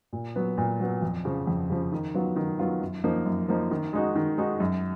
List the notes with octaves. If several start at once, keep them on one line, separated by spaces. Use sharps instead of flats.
A#2
F#3 B3
A#2
F#3 B3
F2
C#3 F3
F2
C#3 F3
D#3
F#3 B3 F4
D#3
F#3 B3 F4
F#2
F3 A#3 D#4
F#2
F3 A#3 D#4
D#3
G#3 D#4 F#4
D#3
G#3 D#4 F#4
F#2